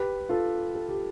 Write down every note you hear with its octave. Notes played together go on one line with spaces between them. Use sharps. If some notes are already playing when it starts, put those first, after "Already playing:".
Already playing: G4 B4
F4 A4
A4
G4